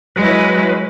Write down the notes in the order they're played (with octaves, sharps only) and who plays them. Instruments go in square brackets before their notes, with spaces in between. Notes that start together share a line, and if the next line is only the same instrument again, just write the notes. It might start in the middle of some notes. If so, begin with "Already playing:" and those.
[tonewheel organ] F#3 B4 [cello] G#3 E4